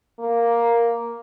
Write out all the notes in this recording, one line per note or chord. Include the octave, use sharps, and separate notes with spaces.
A#3